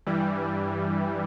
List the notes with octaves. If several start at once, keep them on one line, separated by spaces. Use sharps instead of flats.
G2 E3 G3